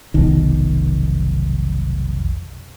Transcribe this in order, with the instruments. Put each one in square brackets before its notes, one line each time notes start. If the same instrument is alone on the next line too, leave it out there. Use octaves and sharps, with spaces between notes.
[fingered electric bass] F1 B1 D#3